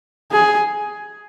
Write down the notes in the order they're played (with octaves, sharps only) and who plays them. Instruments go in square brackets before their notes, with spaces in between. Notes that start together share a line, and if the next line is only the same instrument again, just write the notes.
[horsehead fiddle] G#4